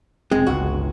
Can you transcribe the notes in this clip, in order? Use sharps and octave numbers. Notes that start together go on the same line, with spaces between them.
F1 G#3 C4
G1 C#2 F#4